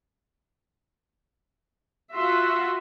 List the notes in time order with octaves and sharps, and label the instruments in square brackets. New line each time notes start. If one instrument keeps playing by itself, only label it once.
[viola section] F4 F#4 E5 [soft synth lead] C6